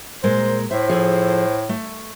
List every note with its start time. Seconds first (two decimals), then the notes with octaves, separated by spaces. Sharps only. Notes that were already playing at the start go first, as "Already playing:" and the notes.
0.24 A#2 G#3 A#4 C5
0.71 A2 C5 E5
0.89 F3 G#4 A4
1.69 A3